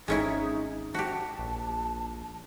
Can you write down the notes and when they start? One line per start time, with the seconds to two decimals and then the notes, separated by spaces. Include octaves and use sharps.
0.08 G#1 G#3 C#4 D#4 E4
0.94 F#4 G4 A5
1.39 A#1